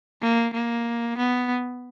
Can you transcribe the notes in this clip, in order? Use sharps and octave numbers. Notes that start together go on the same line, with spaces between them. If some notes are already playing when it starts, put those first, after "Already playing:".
A#3
A#3
B3